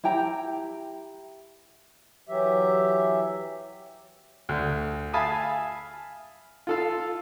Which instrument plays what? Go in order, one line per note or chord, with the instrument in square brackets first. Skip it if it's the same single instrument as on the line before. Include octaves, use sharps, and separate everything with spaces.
[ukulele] E4 G4 G5 A#5
[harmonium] E3 F#3 G4 E5
[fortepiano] D2
E5 F5 G#5 A5 B5 D#6
F4 A4 F5